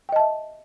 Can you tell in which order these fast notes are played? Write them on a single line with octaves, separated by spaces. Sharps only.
G5 D#5 A5 E5